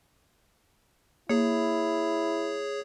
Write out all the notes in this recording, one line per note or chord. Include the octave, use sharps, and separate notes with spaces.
A#3 E4 G#4 C#5